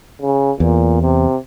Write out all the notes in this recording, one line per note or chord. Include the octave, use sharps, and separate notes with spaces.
C#3
E2 A#2
C3